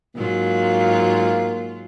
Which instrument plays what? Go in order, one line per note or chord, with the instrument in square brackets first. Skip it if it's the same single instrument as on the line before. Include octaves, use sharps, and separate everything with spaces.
[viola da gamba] G#2 F#3 F4 [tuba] A#3